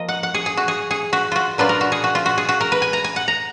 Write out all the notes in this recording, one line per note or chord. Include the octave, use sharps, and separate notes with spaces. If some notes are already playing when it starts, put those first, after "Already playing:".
Already playing: F3 A#3 D#5
F#5
F#5
G#4
G#4
F#4
G#4
G#4
F#4
F4 F#4
A#2 F#3 D4 F4 B4
A#4
F#4
G#4
F#4
F4
F#4
G#4
F#4
A#4
B4
G#5
A#5
G#5
F#5
A#5